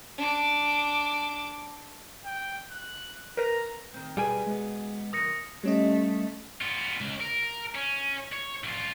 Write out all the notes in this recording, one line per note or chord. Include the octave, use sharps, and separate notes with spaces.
D4 D6
G5
F#6
A#4 B4 A#5 A#6
D#3 C4
B2 G3 G#4 B4 G5 G#5
G#3 B3
F#2 D#3 D#6 A#6 C#7
G3 A3 C#4 D#5
B3 F4
C#2
A#4
C#4
C#5
C2 F4